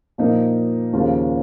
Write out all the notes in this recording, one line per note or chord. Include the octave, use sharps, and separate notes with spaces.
A#2 F3 A#3 D#4 A#4
D#2 C#3 F3 A#3 F4